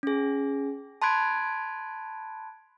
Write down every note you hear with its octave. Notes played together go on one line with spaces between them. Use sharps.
C#4 G#4
A5 B5 C6 F#6 G#6 D7